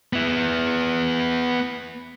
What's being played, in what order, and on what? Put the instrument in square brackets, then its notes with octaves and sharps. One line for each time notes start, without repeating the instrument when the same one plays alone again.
[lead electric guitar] B3 E4